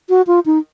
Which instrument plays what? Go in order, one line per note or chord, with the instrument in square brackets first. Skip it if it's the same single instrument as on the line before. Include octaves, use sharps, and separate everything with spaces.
[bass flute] F#4
F4
D#4